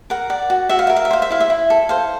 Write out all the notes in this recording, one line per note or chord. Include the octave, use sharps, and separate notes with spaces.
A#4 F#5
D5 F#5
F#4
F#4 E5
F5
A#4 E5
F5
E5
C5 F5
E5
E4 F5
E5
E4
A4
C5 F5